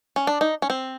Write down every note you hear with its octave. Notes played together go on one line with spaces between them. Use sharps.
C#4
D4
D#4
C#4
C4